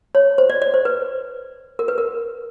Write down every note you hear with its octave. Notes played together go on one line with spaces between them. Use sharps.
C#5
C5
D5
D5
C5
B4
A#4
B4
A#4